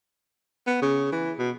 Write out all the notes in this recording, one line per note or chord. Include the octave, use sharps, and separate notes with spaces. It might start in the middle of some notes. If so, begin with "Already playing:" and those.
B3
C#3
E3
B2